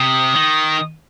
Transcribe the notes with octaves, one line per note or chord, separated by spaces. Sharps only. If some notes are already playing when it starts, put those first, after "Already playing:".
Already playing: C3 D#6
D#3